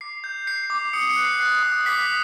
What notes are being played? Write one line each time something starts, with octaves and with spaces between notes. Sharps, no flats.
D6 C7
G6
G6 C7
D6
D#6 C#7
C#7
F#6
C7
F#6
D#6
D6 B6